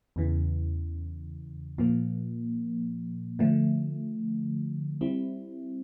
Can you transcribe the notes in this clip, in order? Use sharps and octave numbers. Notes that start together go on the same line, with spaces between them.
E2 C#3 E3
A#2 F3 A#3
D3 F3 A3
G3 C4 E4